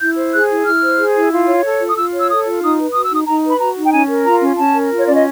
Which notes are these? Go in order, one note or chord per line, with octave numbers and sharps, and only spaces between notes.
E4 G6
C5
G#4 F#6
E4
E4 F6
C5
G#4
E4
F4
C#5
A4
F4
D#6
F4 E6
C#5
E6
A4 D#6
F4
D#4 D#6
B4
F#4 D#6
E6
D#4 D#6
D#4 A#5
B4 B5
F#4 A#5
D#4
G5
C#4 G#5
A#4
F4 A#5
C#4
C#4 A5
A#4
F4
C#5
C#4 D5
D#5